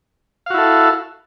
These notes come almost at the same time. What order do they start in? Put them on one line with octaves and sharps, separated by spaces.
F5 F#4 E4 A4